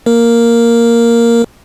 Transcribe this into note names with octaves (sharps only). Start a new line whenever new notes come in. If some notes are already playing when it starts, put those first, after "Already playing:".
A#3 A#4